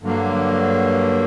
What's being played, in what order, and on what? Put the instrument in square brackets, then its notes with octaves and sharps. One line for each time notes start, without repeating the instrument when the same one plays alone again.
[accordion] G2 D3 F#3 A#3